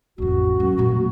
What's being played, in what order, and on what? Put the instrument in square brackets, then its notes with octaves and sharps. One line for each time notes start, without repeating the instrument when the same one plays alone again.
[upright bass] A1 F2 [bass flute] F#4
[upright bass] F#2
A#2 A#3